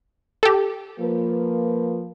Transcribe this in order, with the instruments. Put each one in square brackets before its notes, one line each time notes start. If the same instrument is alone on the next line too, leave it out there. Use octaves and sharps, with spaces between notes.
[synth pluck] G4 A4
[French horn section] F3 A#3 B4